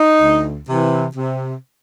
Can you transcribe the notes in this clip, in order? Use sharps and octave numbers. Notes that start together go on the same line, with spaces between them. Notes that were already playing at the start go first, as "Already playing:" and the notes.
Already playing: D#4
D2
C3 E3
C3